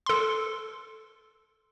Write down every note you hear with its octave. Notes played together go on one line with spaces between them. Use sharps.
A4 C6